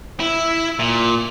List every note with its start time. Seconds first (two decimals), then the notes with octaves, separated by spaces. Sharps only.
0.20 E4
0.79 A#2